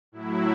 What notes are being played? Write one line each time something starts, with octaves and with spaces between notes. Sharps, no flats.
A2 F#3 E4